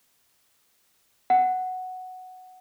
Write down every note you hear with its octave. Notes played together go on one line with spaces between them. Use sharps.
F#5